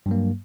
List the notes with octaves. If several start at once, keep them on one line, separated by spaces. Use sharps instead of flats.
G2 F#3 A#3